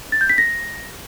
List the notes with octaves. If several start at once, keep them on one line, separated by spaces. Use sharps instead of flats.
A6
G6
B6
A#6